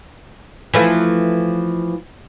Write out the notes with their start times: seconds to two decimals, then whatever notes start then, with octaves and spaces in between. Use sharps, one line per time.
0.74 E3 F3 A3